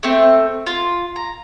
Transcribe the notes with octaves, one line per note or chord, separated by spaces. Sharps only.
A3 C4
F4
A#5